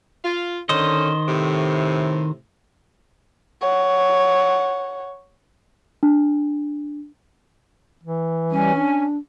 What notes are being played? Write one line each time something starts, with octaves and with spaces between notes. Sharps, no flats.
F4
D3 D#3 C#4 C5 D#5
A2 C3
C#5 F#5
D4
E3
G3 C#4 G#5
D4